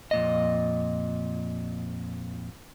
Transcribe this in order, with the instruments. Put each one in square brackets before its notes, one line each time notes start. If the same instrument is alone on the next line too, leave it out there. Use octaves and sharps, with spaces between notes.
[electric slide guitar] F2 A#2 D#5